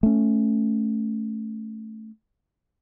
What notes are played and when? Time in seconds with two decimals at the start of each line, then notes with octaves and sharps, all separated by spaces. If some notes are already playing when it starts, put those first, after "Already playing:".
0.03 A3 C#4